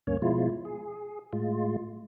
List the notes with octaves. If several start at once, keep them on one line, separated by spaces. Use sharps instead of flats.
D2 G2 A#3 C#4 C#5
B2 F3 G#3 E4 F4
G#4
A2 G#3 F4